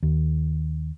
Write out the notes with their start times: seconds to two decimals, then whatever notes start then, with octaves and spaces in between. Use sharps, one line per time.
0.03 D#2